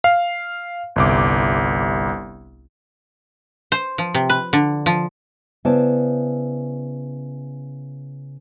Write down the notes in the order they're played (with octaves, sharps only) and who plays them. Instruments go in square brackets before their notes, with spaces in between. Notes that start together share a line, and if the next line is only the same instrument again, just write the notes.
[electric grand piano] F5
G1 C2 D6
[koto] C5
F3
C3
B4
D3
F3
[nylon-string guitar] C#3 B3 E4 C5 D5 A5